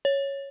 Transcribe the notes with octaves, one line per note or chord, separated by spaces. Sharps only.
C#5